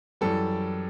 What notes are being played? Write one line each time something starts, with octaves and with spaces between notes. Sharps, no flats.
F#2 E3 G3 A4